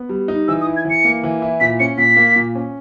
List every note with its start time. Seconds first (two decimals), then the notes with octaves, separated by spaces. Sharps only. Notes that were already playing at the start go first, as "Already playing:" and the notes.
Already playing: B3
0.09 G3
0.28 D#4
0.48 E3 E6
0.61 D#6
0.67 E4
0.76 G#6
0.85 E3
0.90 C#7
1.05 A#3
1.24 E3
1.42 E4
1.60 A#2 B6
1.80 C#4 C#7
1.98 A#2 B6
2.16 A#3
2.36 A#2
2.55 C#4